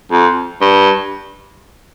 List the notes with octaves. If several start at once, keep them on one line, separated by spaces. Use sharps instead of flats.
F2
G2